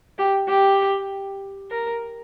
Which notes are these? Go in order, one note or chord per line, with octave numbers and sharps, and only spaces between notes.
G4
G4
A#4